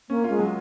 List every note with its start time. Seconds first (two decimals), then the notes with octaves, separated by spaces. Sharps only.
0.09 A#3 C#4
0.24 G#3 F4
0.39 F#3